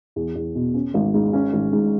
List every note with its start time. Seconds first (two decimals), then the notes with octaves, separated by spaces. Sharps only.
0.16 E2
0.35 E2
0.55 B2
0.74 C#4
0.94 G#1
1.14 G#2
1.33 C#4
1.53 G#1
1.72 G#2